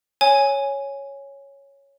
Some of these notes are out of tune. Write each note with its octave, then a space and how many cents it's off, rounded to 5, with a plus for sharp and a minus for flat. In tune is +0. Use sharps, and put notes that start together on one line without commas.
C#5 +0 G#5 +0